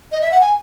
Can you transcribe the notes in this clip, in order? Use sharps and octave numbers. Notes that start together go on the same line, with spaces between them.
D#5
E5
F#5
G#5